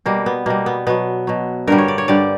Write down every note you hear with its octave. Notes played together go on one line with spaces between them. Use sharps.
B2 G3 A#3
B3
B2 G3 A#3
B3
B2 F#3 B3
B2 F#3
G2 D3 G3 A#4
C#5
D5
C#5
G2 D3 G3 D5